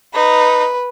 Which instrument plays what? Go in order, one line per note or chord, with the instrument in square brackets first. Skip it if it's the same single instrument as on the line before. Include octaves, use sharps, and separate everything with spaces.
[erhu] D#4 [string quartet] B4